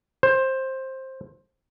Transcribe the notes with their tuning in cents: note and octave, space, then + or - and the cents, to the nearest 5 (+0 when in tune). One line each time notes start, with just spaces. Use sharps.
C5 +15